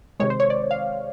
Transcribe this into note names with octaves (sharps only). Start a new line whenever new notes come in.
C3 D#3 G#3 C#5
C5
C#5
D5
F5